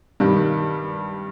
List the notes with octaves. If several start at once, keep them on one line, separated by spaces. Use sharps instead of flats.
G2 D#3 G3